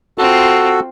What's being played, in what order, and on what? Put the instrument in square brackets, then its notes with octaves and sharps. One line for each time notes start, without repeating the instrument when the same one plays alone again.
[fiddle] C4 F4 [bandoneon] F#4 A4